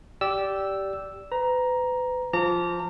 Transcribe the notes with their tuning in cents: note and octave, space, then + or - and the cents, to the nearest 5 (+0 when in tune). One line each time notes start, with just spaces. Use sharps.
G4 -10 D5 -10 E6 +0
B4 +35 A#5 +10
F3 +0 A#5 -30 D6 -25